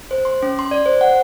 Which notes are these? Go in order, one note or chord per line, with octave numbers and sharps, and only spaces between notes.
C5
C6
C#4
C6
D5
C5
F#5